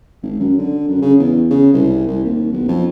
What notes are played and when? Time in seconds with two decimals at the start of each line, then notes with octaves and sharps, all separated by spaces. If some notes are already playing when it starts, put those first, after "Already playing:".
0.23 G#1
0.40 F#2
0.58 D3
0.88 F#2
1.02 C#3
1.20 E2
1.50 C#3
1.73 C2
2.07 C2
2.25 D#2
2.53 B1
2.68 F2